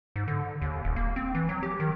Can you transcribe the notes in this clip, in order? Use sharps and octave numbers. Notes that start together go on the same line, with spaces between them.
G#2
D3
D#2
D#1
A#3
C4
E3
F#3
G4
D#3